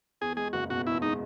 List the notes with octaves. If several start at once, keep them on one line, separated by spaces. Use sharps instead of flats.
E2 G#4
G#3 G#4
F#1 F#4
B2 F#4
E2 E4
G#3 D#4